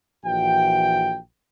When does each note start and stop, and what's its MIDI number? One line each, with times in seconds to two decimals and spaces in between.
0.25 1.18 34
0.25 1.18 52
0.25 1.18 66
0.25 1.18 79